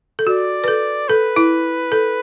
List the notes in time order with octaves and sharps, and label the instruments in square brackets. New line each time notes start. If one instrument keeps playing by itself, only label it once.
[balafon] A4
[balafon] F#4 [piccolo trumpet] D5
[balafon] B4
A4
[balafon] A4 [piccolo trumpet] B4
[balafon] E4
A4